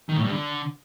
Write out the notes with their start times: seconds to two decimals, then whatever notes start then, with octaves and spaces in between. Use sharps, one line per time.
0.09 D#3
0.16 A2
0.24 G2
0.31 D3